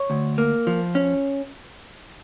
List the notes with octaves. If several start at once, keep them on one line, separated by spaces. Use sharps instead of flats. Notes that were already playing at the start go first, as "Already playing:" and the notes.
Already playing: C#5
D2
A#3
F3
C#4